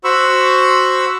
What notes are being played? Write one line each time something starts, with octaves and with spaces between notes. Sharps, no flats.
F#4 C5 B5 C#6 E6